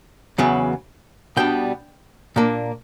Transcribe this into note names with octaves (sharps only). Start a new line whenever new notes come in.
E2 C#3 F#3 B3
B2 G3 B3 D4 G5
A#2 A#3 D4